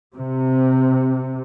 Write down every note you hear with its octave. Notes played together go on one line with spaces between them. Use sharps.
C3